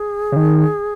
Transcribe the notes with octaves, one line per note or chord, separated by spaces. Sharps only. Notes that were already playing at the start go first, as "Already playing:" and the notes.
Already playing: G#4
C#3
D#3